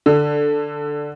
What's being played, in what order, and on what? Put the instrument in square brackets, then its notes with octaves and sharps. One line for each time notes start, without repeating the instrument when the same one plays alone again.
[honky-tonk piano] D3